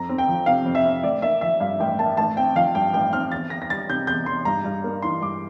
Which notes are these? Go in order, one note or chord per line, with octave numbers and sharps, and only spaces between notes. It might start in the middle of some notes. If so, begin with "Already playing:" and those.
Already playing: F2 A#5
C4
G5
F3
C3 F5
F2
E5
C4
A1 D5
A#3 E5
F3 E5
G2 F5
A1 G5
A#3 A5
A1 A5
C4 G5
F3 F5
G2 G5
A1 G5
C4 F6
E2 A6
E2 A#6
A#6
G3 A6
C3 G6
E2 G6
E2 C6
G2 A#5
G2
A#3
E3 C6
G2 D6